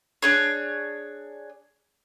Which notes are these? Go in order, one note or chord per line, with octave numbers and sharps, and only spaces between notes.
D4 G#4 C#5